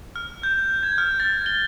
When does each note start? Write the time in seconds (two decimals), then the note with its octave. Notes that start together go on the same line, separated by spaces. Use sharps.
0.16 F6
0.43 G6
0.83 G#6
0.98 F6
1.20 A6
1.46 G7